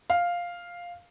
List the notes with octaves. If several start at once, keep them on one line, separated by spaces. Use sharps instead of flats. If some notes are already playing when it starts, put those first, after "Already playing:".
F5